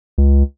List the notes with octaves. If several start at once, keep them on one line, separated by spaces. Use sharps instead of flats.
C#2